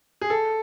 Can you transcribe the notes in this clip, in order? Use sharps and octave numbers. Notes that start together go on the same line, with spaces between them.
G#4
A4